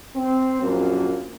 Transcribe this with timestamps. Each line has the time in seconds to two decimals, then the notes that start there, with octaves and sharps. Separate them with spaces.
0.16 C4
0.62 A#1 F#2 A#3